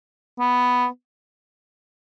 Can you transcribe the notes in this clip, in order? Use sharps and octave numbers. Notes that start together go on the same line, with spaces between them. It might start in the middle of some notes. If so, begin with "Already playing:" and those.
B3